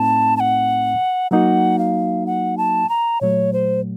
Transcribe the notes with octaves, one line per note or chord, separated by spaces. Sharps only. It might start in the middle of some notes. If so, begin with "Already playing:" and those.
Already playing: A2 A3 C4 D#4 A5
A5
F#5
F#3 A#3 D#4 F#4 F#5
F5
F#5
A5
A#5
A#2 F#3 A3 C#5
C5